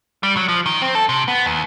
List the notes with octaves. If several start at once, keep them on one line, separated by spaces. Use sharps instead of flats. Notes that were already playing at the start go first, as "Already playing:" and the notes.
G3
F#3
F3
D#3
C4
A4
C3
B3
D#2